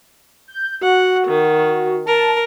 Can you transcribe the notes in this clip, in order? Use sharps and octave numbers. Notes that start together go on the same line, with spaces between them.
G6
F#4 F#5
D#3
A#4 A5